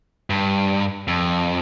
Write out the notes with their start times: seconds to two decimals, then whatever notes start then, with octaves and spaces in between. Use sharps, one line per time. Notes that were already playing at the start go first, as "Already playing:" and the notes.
0.30 G2
1.08 F2